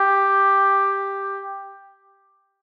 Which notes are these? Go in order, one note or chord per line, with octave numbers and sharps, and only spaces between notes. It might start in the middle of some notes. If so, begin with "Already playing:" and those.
Already playing: G4